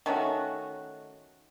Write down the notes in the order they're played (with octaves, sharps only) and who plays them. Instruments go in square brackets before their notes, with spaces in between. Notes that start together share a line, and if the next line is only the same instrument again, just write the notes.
[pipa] D#3 A3 C#4 F#4